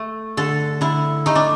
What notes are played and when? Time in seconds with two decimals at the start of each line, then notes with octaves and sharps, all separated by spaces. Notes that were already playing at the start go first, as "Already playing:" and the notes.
Already playing: A3
0.37 D3 A4
0.81 D3 E4
1.26 A3 D#4
1.35 D4